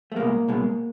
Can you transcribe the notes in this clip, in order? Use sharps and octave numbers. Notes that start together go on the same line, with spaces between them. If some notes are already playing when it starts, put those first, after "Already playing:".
A3
C2 B2 G#3 A#3
C2 B2 G#3